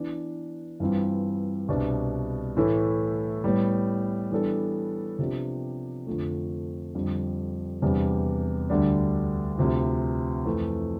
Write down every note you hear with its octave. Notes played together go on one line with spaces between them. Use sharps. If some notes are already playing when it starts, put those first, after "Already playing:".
Already playing: E3 B3 D4
G2 E3 G3 C4 F4
C2 B2 B3 D4
A2 E3 A3 E4 A4
A2 G3 B3
E3 G3 B3 D4 A4
C3 F3 B3 D4 G4
F2 D3 F3 A3
F2 D3 G3
E2 C3 G3 D4
D2 D3 G3 D4
D2 C3 F3
F2 E3 A3